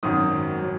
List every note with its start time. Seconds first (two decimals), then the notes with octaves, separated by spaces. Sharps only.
0.03 G#1 F#2 D#3 F#3 D#6
0.63 F#3